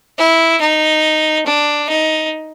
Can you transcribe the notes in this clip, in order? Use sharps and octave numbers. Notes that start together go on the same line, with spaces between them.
E4
D#4
D4
D#4